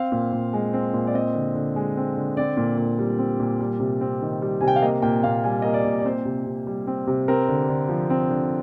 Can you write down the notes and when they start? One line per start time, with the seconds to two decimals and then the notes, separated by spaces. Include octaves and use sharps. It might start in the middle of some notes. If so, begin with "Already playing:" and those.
Already playing: C4 F5
0.12 A#2
0.33 A#2
0.53 G#3
0.73 C4
0.94 A#2
1.07 D5
1.14 C4 D#5
1.35 D3
1.55 D3
1.76 G#3
1.97 C4
2.17 D3
2.37 C4 D5
2.57 A#2
2.78 A#2
2.99 G3
3.19 C4
3.40 A#2
3.60 G3
3.80 C3
4.01 C4
4.22 D#3
4.42 G3
4.61 C3 G#5
4.68 G5
4.76 F5
4.82 A#3 D#5
5.02 A#2 G5
5.23 A#2 F5
5.44 G3 G#5
5.62 A#3 D#5
5.74 D5
5.85 A#2
6.00 D5
6.05 C4 C5
6.25 C3
6.46 C3
6.67 G3
6.87 C4
7.07 C3
7.28 C4 A#4
7.48 D3
7.69 D3
7.89 F3
8.10 C4
8.30 D3